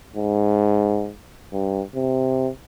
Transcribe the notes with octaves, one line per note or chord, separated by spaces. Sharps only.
G#2
G2
C3